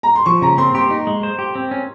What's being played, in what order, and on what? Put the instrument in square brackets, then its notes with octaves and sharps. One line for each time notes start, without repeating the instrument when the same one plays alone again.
[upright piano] A#5
C6
[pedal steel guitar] F3 [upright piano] C#6
[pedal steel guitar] C#3 [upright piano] A#5
[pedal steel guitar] C4 [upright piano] C6
[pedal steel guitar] G4 [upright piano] C6
[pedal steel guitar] D#4
G#3
C5
G4
C4
C#4